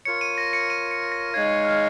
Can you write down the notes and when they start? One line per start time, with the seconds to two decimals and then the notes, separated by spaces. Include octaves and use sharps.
0.05 F4 A#4 C#5 C#7
0.21 D#7
0.38 A#6
0.53 C#7
0.70 D#7
0.91 C#7
1.12 A#6
1.34 G#3 D#4 C#5 F5 G#6
1.65 F6